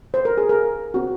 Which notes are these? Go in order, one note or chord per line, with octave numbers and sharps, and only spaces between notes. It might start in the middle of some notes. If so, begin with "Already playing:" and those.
C5
A#4
G#4
A#4
C4 F#4